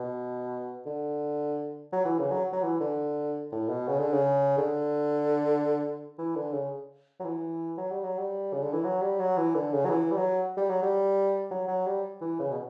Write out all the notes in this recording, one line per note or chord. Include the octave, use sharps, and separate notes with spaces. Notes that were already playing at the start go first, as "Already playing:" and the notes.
Already playing: B2
D3
F#3
E3
C#3
F#3
F#3
E3
D3
A2
B2
C#3
D3
C#3
D3
E3
D3
C#3
F#3
E3
F#3
G3
F#3
G3
C#3
D3
E3
F#3
G3
F#3
E3
D3
C#3
F#3
E3
G3
F#3
G3
F#3
G3
F#3
F#3
G3
E3
C#3
B2